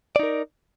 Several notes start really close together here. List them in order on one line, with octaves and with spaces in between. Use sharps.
D5 D#4 A#4